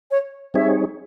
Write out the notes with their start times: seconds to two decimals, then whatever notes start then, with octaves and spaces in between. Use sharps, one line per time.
0.11 C#5
0.54 G3 C4 D#4 G#4 C#5 E5